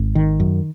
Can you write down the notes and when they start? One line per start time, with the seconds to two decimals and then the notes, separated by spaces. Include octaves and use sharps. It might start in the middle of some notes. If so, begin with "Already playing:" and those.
Already playing: G#1
0.15 D#3
0.40 F#2